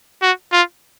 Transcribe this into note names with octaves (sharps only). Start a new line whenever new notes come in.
F#4
F4